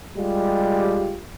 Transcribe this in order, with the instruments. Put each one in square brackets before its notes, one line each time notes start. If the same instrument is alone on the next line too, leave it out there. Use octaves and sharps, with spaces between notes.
[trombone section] G3 G#3 F4 G4